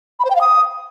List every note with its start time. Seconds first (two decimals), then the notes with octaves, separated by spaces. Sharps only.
0.19 B5
0.25 C5
0.30 G5
0.36 F5
0.41 D#6